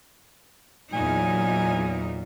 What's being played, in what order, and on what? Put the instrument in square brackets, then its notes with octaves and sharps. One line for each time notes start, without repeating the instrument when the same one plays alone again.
[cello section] E2 D#4 [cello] A#2 [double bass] F#3 [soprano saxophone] G#5